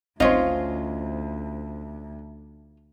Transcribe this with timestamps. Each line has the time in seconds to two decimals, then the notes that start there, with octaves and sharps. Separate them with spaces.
0.20 G#1 D2 C4 C#4 D#4 F4 C5 D#5